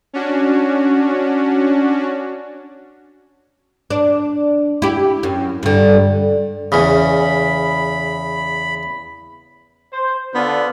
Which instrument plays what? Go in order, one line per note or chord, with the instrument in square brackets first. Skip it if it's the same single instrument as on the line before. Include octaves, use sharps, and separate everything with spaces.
[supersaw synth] C#4 D4 F#4
[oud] D4
E4 G4
F#2
G2 D3
[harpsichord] E2 C#3 [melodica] B5
[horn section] C5
[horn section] D3 F4 [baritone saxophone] B3